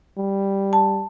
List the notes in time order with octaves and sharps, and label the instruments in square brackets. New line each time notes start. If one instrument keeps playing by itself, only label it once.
[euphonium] G3
[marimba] A5